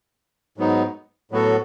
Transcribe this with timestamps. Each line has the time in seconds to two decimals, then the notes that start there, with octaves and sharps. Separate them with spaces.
0.57 G#2 F#3 B3 D#4
1.31 A2 F#3 B3 F#4 A4